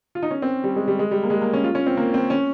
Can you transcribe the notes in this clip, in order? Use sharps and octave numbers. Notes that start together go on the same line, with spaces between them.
F4
D#4
C#4
C4
G3
G#3
G3
G#3
G3
A#3
G#3
A#3
C#4
F4
C#4
C4
A#3
C4
C#4